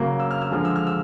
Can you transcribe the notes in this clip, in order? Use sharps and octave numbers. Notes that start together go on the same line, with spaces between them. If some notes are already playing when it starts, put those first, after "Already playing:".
Already playing: C#3 F#3 A#3
E6
F6
E6
D3 F3 G#3 F6
E6
F6
E6